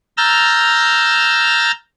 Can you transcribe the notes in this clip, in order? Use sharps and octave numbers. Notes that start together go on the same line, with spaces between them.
A#5 E6 F6 G6 A6